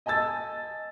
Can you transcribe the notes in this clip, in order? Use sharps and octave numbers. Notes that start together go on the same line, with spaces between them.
D#5 G#5 A5 E6 A6